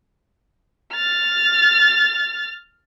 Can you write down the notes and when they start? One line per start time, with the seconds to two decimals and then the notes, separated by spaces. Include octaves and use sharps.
0.93 F6 A6